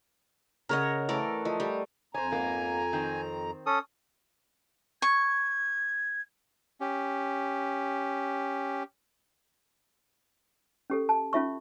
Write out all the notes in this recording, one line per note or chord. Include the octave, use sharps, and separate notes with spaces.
C#3 A#4 C#5 D#5 F#5
E3 A3 A4 A#4 D5
F3 D#5
G3
F2 C5 C#5 G#5 A#5
G#2 A#3 B3
D#3 C4
C#4 A4 D#6
C#6 G#6
C#4 G4
C#4 G4 A4
A5
C#4 F4 E5 C#6